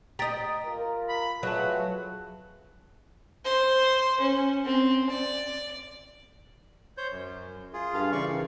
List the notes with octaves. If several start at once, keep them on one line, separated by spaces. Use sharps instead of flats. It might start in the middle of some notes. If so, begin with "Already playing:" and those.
G4 D#5 A#5 A6 D7
F4 A#4
B5
F#3 A3 F4 G#4 B4 F#5 A5
C5
C#4
C4
D5
C5 C#5 G6
F#2
F4 G#4
G2 A4 F5
C#3 E3 D5 F5 C#6
D#3